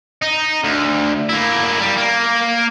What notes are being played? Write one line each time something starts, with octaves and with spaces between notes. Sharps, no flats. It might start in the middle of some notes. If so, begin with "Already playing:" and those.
D#4
D2
A#3 E4
G3
A#3